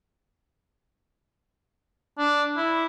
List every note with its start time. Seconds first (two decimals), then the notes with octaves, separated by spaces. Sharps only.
2.18 D4
2.57 E4